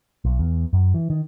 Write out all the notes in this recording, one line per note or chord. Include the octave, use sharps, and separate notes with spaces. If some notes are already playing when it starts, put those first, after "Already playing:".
B1
E2
F#2
E3
D#3